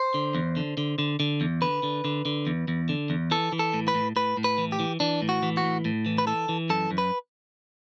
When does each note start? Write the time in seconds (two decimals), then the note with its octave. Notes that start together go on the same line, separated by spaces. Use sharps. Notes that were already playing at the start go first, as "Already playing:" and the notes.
Already playing: C5
0.14 D3
0.35 E2
0.57 D3
0.77 D3
0.98 D3
1.20 D3
1.41 E2
1.62 D3 B4
1.83 D3
2.05 D3
2.25 D3
2.47 E2
2.68 E2
2.89 D3
3.10 E2
3.31 E3 A4
3.52 E3
3.59 A4
3.73 A2
3.88 B4
3.95 A2
4.16 A2 B4
4.37 A2
4.44 B4
4.58 E3
4.72 G4
4.80 E3
5.00 E3 D4
5.22 A2
5.29 F#4
5.43 E3
5.57 F#4
5.64 A2
5.85 A2
6.06 E3
6.18 B4
6.27 E3 A4
6.49 E3
6.70 F#2 A4
6.91 F#2
6.98 B4